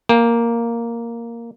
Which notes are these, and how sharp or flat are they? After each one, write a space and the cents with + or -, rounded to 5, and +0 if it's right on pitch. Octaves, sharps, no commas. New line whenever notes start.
A#3 +0 G5 +40